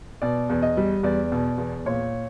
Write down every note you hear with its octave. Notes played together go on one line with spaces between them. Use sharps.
B2 D5
E2
D#5
G3
E2 D5
B2
E2
A#2 C#5